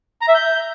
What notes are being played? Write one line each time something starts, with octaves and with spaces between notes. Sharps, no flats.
A#5
E5
G6